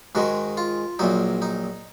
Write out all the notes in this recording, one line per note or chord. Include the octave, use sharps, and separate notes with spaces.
G#2 D#3 G#3 F#4
F4
A#1 A#2 F#3 D#4
D#4